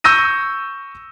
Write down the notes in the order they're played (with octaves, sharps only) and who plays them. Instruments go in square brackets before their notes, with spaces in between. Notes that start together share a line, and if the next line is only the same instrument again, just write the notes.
[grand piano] C#6 E6 G6 A#6 D#7